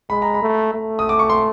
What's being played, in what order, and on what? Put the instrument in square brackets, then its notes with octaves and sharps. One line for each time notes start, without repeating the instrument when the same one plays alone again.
[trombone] G#3 [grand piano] B5
[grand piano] A#5
B5
[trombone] A3
A3
[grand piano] D#6
D6
C#6
C6